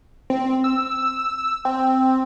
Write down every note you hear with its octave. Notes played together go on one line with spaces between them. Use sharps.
C4
E6
C4